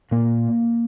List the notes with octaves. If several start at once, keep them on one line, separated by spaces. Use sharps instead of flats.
A#2 A#3